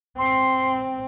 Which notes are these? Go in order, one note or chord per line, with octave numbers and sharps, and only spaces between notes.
C4 C6